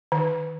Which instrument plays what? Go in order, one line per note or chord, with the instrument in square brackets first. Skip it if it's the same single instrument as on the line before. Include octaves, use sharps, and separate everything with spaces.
[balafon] D#3